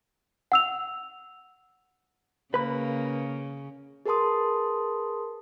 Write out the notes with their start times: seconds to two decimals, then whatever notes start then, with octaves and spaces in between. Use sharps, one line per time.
0.52 F#5 E6 F7
2.54 C#3 A#3 B4 B5
4.06 G#4 A#4 B4 A5 C6 D#6